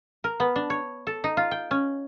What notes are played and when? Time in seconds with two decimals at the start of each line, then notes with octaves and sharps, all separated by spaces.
0.24 A#4
0.40 B3
0.56 D4
0.70 C#5
1.07 A4
1.24 D#4
1.37 F4
1.51 G5
1.71 C#4